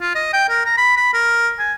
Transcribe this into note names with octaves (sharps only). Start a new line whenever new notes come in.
F4
D#5
G5
A#4
A#5
B5
B5
A#4
G#5